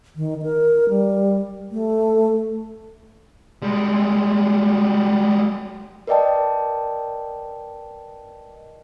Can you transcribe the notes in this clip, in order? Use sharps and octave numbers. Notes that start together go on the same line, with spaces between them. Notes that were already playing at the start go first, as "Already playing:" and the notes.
D#3
A#4
G3
A3
G3 G#3
A#4 B4 D5 D#5 G5 A5